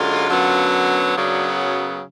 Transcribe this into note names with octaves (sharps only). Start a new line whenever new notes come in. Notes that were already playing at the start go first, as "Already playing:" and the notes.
Already playing: F#2 D3 G#3 F4
F#2 D3 F#3 B3
F#2 C#3 F#3 B3 D4